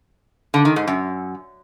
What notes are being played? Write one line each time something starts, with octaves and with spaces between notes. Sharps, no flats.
D3
D#3
G#2
F#2